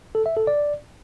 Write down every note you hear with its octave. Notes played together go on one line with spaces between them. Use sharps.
A4
E5
A4
D5